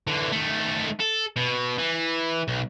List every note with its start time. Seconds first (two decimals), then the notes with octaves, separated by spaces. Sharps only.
0.07 D3 E3
0.32 D#3 A3
1.00 A4
1.36 B2
1.79 E3
2.48 B1